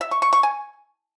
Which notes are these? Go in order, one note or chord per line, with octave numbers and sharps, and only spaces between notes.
E5
C#6
C#6
C#6
G#5